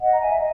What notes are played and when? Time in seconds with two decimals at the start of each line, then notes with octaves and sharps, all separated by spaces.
0.01 D#5 F#5
0.12 A#5
0.19 E5 G#5
0.37 D#5